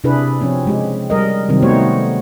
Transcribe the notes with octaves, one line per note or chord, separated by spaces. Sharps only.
C3 D4 E4 G#4 B4
F3 C4 C#4
C#3 G#3 G4
G3 A#4 D#5
C3 D#3 F#3 G3 C4 A#4
A3 B3 D#4 F#4 C5 C#5